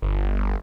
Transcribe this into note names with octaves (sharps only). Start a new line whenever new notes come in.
G1